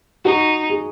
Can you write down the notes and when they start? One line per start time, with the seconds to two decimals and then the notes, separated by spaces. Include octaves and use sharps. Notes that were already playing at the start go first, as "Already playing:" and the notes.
0.25 D#4 F#4
0.70 G#4